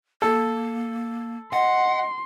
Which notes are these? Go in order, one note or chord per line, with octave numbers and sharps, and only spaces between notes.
A#3 A4
D#5 F#5 C6